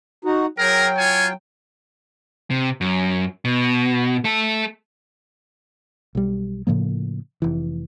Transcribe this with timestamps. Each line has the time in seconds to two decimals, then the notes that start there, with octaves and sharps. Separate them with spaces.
0.25 D#4 F#4
0.58 F#3 G#4 A#4 G5
0.97 F4 C#5 G#5
2.50 C3
2.81 F#2
3.45 B2
4.24 A3 A4
6.15 B1 G3
6.67 A2 C#3 F3 A#3
7.42 F1 E3